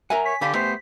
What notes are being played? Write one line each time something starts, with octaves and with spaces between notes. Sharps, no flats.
A#4 E5 F#5 G#5 A#5
C#5 B6
D3 G4 F5 B5
A3 B3 G4 C5